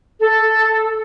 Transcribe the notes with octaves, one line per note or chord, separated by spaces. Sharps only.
A4